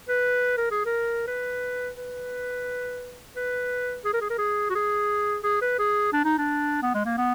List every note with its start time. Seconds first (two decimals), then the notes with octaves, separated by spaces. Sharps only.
0.09 B4
0.58 A#4
0.71 G#4
0.85 A#4
1.27 B4
1.97 B4
3.36 B4
4.05 G#4
4.14 A#4
4.21 G#4
4.30 A#4
4.38 G#4
4.70 F#4
4.75 G#4
5.44 G#4
5.62 B4
5.79 G#4
6.13 D4
6.25 D#4
6.38 D4
6.83 B3
6.95 G#3
7.06 A#3
7.18 B3